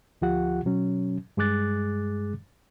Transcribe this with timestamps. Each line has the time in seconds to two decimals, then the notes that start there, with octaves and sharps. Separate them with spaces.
0.21 D2 F3 F4 G4 F#5
0.65 B2 F#3 C#4
1.37 G2 G#3 G#4 D6 F#6 A6